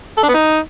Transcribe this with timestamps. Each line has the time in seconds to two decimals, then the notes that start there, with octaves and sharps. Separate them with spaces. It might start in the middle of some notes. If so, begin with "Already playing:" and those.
0.17 A4
0.23 D4
0.29 B3
0.34 D#4